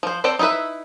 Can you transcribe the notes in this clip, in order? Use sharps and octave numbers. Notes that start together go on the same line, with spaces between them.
F3 C5
C4 A4 C5 D5 G5
D#4 E4 G#4 B4 E5